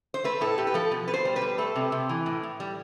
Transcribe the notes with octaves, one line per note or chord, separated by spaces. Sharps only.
C5
A3 B4
A2 A4
A2 G4
B4
F3 A4
B2
B2 B4
C5
G3
B4
G3
A3 A4
C3
C3
E3
A2
A2
G3